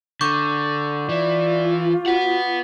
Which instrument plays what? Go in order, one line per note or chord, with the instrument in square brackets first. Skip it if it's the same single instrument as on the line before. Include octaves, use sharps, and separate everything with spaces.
[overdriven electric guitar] D3 [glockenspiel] C#6 D6 G6
[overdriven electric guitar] E3 [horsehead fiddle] F4 [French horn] D5
[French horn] F#4 [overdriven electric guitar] B4 F#5